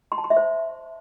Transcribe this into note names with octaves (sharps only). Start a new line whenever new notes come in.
C6
A5
C6
E5
C5